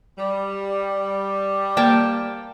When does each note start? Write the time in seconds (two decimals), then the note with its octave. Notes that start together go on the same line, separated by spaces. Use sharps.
0.18 G3
1.77 A#3 G5 A5